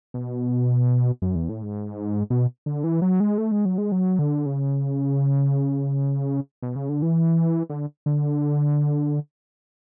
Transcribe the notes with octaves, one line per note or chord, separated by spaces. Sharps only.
B2
F#2
E2
A2
G#2
B2
D3
E3
F#3
G#3
A3
G#3
F#3
G#3
F#3
D3
C#3
B2
C#3
D3
E3
D3
D3